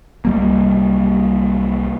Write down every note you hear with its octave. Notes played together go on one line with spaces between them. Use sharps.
C2 G3 A#3